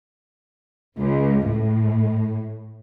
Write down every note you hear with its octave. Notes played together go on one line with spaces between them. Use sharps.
C#2
A2